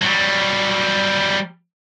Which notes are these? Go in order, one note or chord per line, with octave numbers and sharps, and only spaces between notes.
F#3 G3